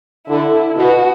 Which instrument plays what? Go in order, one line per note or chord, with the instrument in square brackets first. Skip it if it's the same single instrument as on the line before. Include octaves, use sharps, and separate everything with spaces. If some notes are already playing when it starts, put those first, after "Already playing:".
[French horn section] D3 [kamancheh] E4
[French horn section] B2 [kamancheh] F#4